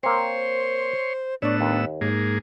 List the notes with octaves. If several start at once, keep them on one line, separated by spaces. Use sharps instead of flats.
A#3 C4 C5 C#5 C6
A2 B3 D4 C#5 D5 E6
D#2
G#2 A#3 D#4 G#4